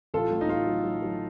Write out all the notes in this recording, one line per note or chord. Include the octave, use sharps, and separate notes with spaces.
A1 F4 A4
A2
D#4
A2 F4
F#3
F#3
F#3